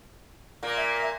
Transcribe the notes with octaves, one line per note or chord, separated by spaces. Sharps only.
A#2 A#3
E5